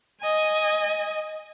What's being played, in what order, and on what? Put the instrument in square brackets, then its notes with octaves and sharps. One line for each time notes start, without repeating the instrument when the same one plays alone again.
[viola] D#5 G#5